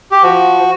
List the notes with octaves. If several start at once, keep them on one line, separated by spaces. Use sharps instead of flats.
G4
F3 F#4